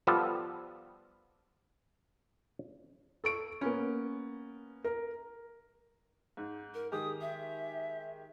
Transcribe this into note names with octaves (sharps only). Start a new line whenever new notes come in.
F3 G3 B3 F4 A4 A5
A4 C#6 D7
A#3 B3 C#4
A#4
G#2
A#4
D#3 G#3 G4 D#6
E5